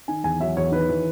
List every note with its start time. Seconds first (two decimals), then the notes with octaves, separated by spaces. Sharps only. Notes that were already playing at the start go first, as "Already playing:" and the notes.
0.08 D#3 G#5
0.24 E2 G#5
0.40 F#3 E5
0.57 E2 C#5
0.72 D#3 B4
0.89 E3